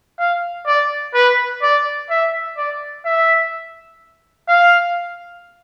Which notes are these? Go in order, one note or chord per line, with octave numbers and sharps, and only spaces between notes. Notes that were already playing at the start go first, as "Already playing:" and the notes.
F5
D5
B4
D5
E5
D5
E5
F5